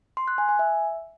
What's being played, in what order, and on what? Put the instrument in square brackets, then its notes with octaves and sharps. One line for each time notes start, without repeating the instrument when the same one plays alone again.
[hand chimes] C6
F#6
G#5
G#5
E5